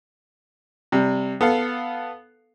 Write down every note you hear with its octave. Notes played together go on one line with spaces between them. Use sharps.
C3 G3
B3 A4 F5